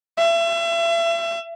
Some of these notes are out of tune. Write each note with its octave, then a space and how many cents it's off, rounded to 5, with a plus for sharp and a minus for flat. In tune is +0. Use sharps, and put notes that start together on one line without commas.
E5 +35